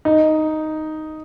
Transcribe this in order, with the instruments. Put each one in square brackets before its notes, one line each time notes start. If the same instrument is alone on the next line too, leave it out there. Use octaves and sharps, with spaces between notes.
[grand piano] D#4